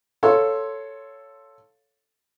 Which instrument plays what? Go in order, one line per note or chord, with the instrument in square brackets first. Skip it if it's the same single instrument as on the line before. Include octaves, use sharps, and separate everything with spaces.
[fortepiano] A4 C#5 F5 C6